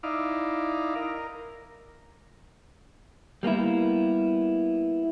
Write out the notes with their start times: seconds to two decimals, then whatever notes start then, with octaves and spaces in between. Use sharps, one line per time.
0.03 D#4 E4 D5 F5
0.96 A#4
3.43 G3 A#3 B3 E4